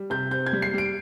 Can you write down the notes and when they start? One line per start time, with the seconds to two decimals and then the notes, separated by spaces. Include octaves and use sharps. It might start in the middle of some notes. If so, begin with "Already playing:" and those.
Already playing: G3
0.10 C3 G6
0.31 C4 G6
0.46 G#6
0.53 G3
0.62 C7
0.73 G3 D7